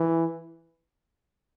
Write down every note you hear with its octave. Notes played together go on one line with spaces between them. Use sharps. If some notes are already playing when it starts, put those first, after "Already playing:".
Already playing: E3